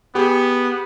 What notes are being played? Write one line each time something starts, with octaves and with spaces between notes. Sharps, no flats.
B3 G4 G#4